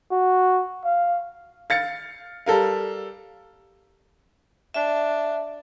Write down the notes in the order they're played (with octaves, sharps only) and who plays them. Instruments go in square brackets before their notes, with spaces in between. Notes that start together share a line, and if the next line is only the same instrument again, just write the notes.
[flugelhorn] F#4
F5
[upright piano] F5 A6 C#7
G3 A4 A#4 F5
[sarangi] D4 [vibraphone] E5